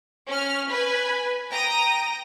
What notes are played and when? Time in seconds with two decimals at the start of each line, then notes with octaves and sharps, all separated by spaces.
0.28 C#4 F6
0.70 B4 G#5
1.50 G5 A#5 D#6 A#6